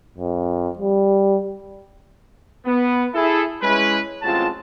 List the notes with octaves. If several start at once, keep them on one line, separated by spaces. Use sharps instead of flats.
F2
G3
B3
E4 G#4 A4
G#3 C#4 E4 B4
A1 F#3 G#3 C4 F4 A5